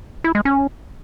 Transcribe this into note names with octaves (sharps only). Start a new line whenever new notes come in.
E4
G#3
C#4